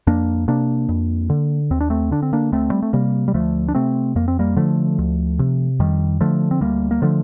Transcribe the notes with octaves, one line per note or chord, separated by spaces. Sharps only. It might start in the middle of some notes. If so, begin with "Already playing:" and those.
F2 A#3 D4
C3 A#3 D4
F2
D3
D#2 C4
D4
A3 C4
D3 D4
C4
A#3 D4
D2 A3 C4
G3
A3
C3 G3 A#3
G3
D2 F3 A3
D4
C3 A3 C4
F2 A#3
C4
G3 A#3
D3 F3 A3
D2
C3
F2 D#3 G3
D3 F3 A3
C4
D2 G3 A#3
A#3
D3 F3 A3